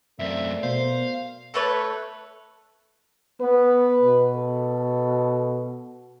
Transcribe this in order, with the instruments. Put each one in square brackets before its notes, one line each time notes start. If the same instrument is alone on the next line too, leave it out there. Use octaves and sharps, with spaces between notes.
[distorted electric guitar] F#2 C4 [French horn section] A3 A#4 D5 [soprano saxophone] E5
[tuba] B2 [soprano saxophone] C5 [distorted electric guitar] F5
[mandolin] A3 A4 B4 C#5
[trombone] B3 [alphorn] B4
[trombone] B2
[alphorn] A4